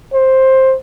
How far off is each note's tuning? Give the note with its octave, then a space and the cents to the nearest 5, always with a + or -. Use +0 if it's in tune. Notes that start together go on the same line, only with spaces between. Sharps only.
C5 +10